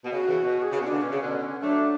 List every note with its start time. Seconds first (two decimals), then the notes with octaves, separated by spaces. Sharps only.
0.04 B2
0.12 C#3 F#4
0.27 C#3 E3
0.43 B2
0.62 G#4
0.72 C#3 F#4
0.82 B2 D3
0.87 C#3 D4
1.02 B2 C#4
1.11 C#3
1.21 B2 D3
1.61 F#3 A3 D4